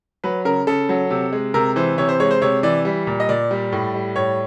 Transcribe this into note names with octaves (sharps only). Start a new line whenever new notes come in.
F#3 B4
C#3 A#4
C#3 A4
F#3
C3
G#3
C3 A#4
E3 C5
C3 C#5
C5
G#3 C#5
C5
C3 C#5
E3 D5
G3
A#2
D#5
A#2 D5
G3
A2
G3
A2 C#5